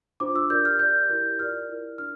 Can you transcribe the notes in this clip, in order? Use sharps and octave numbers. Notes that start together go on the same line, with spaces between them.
D4 F4 C5 D6
E6
G4 A#4 D5 G6
F6
G4 D5 G6
E4 G4 A#4
F4 A#4 D5 F6
E4 A#4 D5
D4 F4 F6